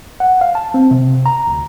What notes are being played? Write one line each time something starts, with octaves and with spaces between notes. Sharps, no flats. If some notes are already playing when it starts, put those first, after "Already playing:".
F#5
F5
A5
C4
C3
A#5
D2